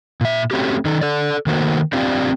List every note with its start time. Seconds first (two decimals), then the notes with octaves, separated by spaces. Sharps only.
0.21 A#2 E5
0.51 A3 C4 C#4 F#4 G4
0.85 D#3 D#4 A4
1.01 A4 D5
1.46 D#3 A3 A#3 F#4 C5
1.93 C4 D4 F4 G4 D5